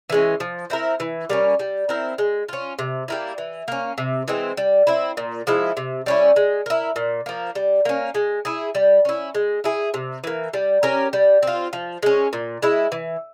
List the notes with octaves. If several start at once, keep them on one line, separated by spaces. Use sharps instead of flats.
E3 G#3 C#4
F3
C4 E4 A#4
E3
G3 A#3 C#4
G3
C4 E4 A#4
G#3
C#4 F4
C3
G3 A#3 E4
E3
A#3 C#4
C3
E3 G#3 C4
G3
C4 E4
A#2
F3 G#3 E4
C3
G3 C#4 E4
G#3
E4 A#4
A#2
F3 A#3
G3
A#3 C#4
G#3
E4 G#4
G3
C#4 E4
G#3
E4 G#4
C3
E3 A#3
G3
C#4 G4 A#4
G3
C4 F4
F3
G#3 C#4
A#2
G#3 E4
E3